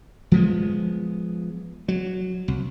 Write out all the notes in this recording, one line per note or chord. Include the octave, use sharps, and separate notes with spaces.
F3 G#3 B3
F#3
C2